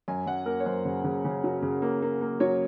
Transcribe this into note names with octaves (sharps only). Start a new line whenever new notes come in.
F#2 G#5
F#2 F#5
A#3 A#4
C#5
F#2 C5
C#3
C#3
C#3
F#3
C#3
A#3
A#3
A#3
F#3 C#5